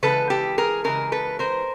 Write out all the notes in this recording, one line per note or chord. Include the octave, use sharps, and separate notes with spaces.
C#3 E3 G#3 A4 B4
G4 A4
G#4 A#4
C#3 E3 G#3 G#4 A#4
A4 B4
A#4 C5